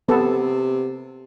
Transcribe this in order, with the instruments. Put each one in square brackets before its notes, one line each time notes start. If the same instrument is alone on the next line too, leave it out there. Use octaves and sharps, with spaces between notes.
[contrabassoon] C3 [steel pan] B3 A4